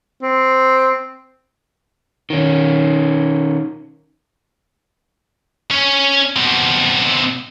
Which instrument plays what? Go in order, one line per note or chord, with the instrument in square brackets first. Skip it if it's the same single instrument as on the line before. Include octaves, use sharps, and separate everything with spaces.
[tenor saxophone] C4
[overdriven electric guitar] D#3 C#4
[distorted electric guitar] C#4 C#5
B2 C4